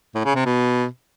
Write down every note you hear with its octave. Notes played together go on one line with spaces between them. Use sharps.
A2
C#3
C3
B2